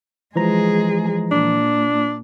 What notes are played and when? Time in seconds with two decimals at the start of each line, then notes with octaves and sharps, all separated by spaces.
0.36 E3 F3 G#3 G#4 A#5
1.32 A#2 D4